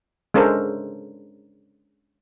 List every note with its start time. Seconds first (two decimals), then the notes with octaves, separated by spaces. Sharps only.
0.34 G#3 C#4 D4 A4 A#4 C5